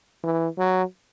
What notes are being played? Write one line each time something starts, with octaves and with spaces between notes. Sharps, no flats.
E3
F#3